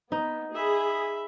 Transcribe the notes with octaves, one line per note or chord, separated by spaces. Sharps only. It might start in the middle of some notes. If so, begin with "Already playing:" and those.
B3 D#4
G#4 E5 B5